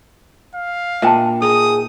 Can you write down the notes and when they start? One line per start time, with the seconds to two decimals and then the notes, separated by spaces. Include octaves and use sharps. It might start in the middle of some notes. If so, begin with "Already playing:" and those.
0.55 F5
1.02 A#2 D4 E5 G5 A5
1.42 D#4 G#4 D#6